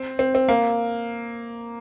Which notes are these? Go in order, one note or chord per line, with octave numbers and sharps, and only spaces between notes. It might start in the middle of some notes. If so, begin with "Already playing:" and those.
Already playing: C4
C4
C4
A#3